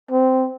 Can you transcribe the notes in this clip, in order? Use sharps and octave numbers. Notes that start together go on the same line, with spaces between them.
C4